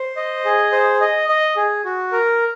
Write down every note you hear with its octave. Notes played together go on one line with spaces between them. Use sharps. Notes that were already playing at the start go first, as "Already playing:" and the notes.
Already playing: C5
D#5
G#4
C5
D#5
D#5
G#4
F#4
A#4